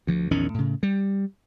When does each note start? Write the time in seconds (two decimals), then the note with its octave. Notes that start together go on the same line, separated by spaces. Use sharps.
0.07 D2 F3
0.31 A#1 E2 D#3 C#4
0.54 A2 C#3
0.83 G3